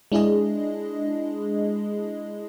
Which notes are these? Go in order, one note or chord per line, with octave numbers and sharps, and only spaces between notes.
G#3 D4 E4 G#4 D#5